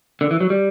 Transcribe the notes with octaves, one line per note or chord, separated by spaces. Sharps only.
D3
E3
F#3
G3